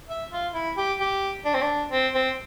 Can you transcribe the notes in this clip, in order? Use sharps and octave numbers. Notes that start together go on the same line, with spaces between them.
E5
F4
E4
G4
G4
D4
C4
D4
C4
C4